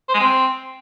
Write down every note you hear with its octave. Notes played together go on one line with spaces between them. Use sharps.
C5
G#3
C4